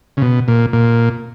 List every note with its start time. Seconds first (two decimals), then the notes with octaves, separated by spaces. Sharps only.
0.17 C#3
0.22 B2
0.48 A#2
0.73 A#2